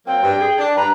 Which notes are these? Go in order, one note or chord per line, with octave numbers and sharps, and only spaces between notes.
F#3 A#3 C4 G5
G2
G#4
D4
G2 B4 A#5